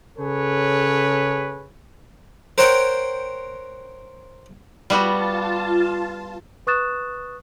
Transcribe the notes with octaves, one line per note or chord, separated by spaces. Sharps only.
C#3 G#4 A4 B4 C#5
A#4 C5 C#5 F#5 G5
G3 B3 F4 F#4 A5
B4 C#6 D#6 F#6 A6 E7